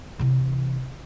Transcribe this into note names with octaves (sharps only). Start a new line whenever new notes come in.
C3 E3